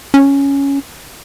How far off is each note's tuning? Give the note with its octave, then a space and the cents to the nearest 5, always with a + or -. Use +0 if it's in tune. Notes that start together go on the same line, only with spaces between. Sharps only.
C#4 +5